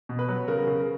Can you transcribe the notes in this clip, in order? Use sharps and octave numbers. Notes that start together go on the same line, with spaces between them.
B2
B4
F#3
C#3 A#4
C#3